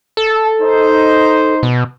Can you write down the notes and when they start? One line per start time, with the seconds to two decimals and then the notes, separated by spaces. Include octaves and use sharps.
0.17 A4
0.62 D#4 C5
1.63 B2